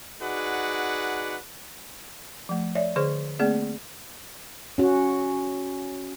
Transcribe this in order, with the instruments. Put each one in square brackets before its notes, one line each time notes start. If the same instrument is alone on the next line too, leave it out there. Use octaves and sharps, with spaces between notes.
[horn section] D#4 F#4 G#4 B4 D5 F#5
[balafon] F3 A3
C#5 D5 E5
D3 G#4 C5 C#5 C#6
A3 A#3 C4 G#4 D5
[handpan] C#4 F#4